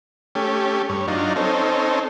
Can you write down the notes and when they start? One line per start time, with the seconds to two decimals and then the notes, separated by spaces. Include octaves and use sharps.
0.35 A3 C#4 G4
0.89 G2 C#5
1.08 F#3 D4 D#4 F4
1.36 C4 C#4 D#4 A4